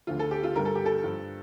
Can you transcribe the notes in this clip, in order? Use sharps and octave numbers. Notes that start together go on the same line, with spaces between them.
D2 D3 F3 F4
A4
G4
F4
G2 D3 G3 A#4
A4
G4
A4
G2 F3